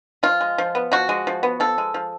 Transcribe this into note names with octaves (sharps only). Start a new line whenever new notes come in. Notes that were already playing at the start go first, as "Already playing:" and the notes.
F3 F4
G#3
F3
B3
F3 F#4
G#3
F3
B3
F3 A4
G#3
F3